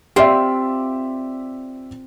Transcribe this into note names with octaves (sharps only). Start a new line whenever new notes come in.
C4 F4 G4 D5 E5